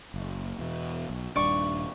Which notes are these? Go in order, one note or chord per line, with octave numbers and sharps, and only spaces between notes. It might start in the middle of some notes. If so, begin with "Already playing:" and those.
F#1
E2 B2
B1
D#1 G2 D4 D5 C#6